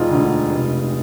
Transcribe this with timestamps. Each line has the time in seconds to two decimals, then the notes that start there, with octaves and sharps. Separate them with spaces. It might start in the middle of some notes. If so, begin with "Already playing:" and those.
Already playing: E1 D#4 F4
0.11 D2 D3
0.51 F1